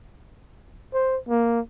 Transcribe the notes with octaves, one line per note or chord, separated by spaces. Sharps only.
C5
A#3